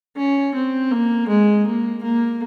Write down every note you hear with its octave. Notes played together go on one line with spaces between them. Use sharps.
C#4
C4
A#3
G#3
A#3
A#3